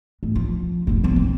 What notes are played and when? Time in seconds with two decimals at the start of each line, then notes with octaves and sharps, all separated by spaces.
0.23 A2
0.35 F3
0.87 F1 B2
1.04 F#3 B3
1.16 C4